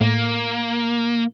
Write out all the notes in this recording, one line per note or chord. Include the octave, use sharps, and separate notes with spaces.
A2 A#3